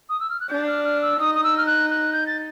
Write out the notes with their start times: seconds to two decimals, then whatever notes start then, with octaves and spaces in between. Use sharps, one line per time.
0.09 D#6
0.20 E6
0.30 F6
0.40 F#6
0.50 D4 G6
0.67 F6
0.84 F6
1.02 E6
1.20 D#4 D#6
1.35 D#6
1.44 E6
1.58 F6
1.67 F#6
1.90 F#6
2.13 G6
2.27 A6